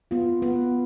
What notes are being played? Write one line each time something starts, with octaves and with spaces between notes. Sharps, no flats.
B3 F4
B3